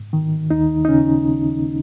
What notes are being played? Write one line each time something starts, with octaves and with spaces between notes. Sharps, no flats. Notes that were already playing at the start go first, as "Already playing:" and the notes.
Already playing: G#2
D#3
D#2 D#4
D#4
C#3 C#4